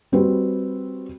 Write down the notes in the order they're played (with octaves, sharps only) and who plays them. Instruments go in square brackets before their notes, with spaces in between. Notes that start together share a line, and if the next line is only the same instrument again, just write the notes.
[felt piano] G3 C4 F#4 B4